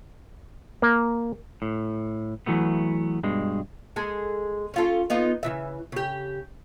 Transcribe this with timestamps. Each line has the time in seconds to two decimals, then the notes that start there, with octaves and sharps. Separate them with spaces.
0.82 A#3
1.62 A2
2.46 E3 F#3 A3 B3
3.23 G2 B2 G#3
3.96 G#3 G#4 A4
4.74 C#4 F4 A4
5.10 B3 D#4 F4
5.43 C#3 E3 E5
5.92 C#3 G4